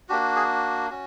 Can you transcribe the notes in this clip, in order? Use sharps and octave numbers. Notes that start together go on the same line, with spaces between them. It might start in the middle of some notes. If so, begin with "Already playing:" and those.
A#3 D4 F#4 G4
G#4
C#4 F#4